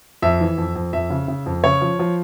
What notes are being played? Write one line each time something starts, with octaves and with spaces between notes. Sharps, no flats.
F2 E5
E3
F2
F2
F2 E5
C#3
C#3
F2
C#3 C#5
F3
F3